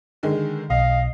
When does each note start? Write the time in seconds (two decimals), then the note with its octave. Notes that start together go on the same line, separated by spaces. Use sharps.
0.23 D3 D#3 G#3
0.70 B1 D#5 F5